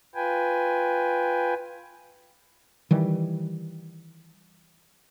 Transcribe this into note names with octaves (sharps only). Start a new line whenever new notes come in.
F4 B4 G5 G#5
D#3 E3 G3